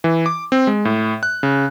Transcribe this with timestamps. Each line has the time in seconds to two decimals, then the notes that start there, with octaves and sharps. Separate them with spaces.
0.04 E3
0.26 D6
0.52 C4
0.67 G#3
0.85 A2
1.23 F#6
1.43 C#3